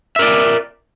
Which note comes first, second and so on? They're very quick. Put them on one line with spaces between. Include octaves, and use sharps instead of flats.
E5 A#4 D5